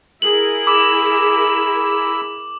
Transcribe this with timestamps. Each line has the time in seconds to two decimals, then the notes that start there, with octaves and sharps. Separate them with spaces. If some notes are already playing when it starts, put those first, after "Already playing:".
0.22 E4 G#4 A#4 F#7
0.67 B5 D6 E6